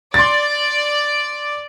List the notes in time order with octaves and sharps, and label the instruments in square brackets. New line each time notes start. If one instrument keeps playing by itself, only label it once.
[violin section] D5 [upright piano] C6 A6